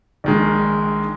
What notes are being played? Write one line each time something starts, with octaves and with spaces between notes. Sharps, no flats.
A#1 D#3 G#3